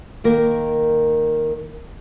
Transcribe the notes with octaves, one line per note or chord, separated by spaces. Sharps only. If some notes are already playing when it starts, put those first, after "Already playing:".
D#3 A#3 A#4